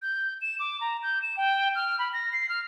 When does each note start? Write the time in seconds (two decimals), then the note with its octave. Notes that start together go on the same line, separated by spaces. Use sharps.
0.02 G6
0.41 E7
0.59 D6
0.81 A#5
1.03 G6
1.22 E7
1.37 G5
1.75 F6
1.99 B5
2.13 A#6
2.33 C7
2.49 F6